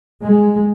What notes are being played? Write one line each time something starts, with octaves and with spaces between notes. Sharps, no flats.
G#3